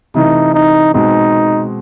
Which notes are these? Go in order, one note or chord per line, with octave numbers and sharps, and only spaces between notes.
C3 E3 A3 D#4
D#4
B2 G#3 C4 D#4